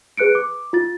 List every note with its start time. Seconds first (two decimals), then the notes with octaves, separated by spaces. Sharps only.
0.17 G#4 B4 F#6 C#7 D7
0.35 D6
0.73 F4 A6